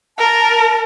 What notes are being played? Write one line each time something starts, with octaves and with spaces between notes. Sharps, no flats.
A#4 A5